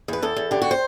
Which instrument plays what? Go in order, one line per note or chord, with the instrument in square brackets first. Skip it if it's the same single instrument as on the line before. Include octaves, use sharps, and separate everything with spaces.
[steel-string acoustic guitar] E2 B4
E2 A4
E2
D3 G4
F#4
C5